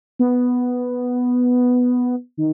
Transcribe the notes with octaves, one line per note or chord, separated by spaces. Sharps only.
B3
D#3